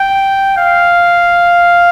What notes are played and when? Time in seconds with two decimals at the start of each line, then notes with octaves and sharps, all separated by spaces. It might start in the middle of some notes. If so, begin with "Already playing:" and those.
Already playing: G5
0.58 F5